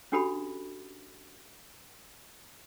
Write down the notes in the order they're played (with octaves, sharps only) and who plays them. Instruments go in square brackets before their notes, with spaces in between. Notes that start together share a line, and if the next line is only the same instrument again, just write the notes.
[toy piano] C#4 D4 F#4 G4 A4 B5